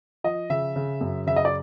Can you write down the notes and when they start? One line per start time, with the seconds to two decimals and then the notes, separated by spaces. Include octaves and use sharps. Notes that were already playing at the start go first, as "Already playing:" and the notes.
0.24 F3 D#5
0.50 C#3 E5
0.76 C#3
1.01 F#2
1.27 C#3 E5
1.36 D#5
1.45 D5